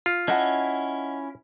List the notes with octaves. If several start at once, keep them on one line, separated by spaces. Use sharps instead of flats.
F4
C#4 E4 D#5 F#5 A5